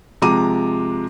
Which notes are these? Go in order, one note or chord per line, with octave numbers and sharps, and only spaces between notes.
C3 F3 G#3 A#5 D6 D#7